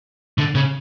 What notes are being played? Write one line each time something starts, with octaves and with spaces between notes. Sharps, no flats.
D3
C#3